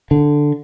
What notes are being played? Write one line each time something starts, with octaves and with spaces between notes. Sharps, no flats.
D3